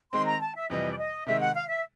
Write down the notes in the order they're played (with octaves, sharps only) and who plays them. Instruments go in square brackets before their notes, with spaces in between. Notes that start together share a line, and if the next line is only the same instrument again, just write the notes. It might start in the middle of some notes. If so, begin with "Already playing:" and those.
[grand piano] D#3 G#3 C4 [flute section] C6
[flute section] A#5
A5
E5
[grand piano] F2 C3 E3 G3 [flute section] D#5
[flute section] D5
D#5
[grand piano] C3 D#3 G#3 [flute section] E5
[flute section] F#5
F5
E5